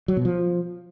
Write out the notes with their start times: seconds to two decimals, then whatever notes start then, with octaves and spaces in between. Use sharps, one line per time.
0.08 F#3
0.17 B2
0.25 F3